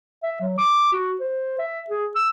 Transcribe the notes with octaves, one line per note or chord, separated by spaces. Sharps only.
E5
F#3
D6
F#4
C5
E5
G#4
E6